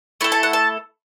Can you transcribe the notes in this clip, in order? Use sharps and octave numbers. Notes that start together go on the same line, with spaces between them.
A3 E4 A4
A5
F#5
A5